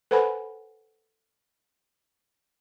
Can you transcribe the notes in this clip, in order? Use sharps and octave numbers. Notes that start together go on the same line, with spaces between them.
A4 B4 C5 F#5 G#5 B5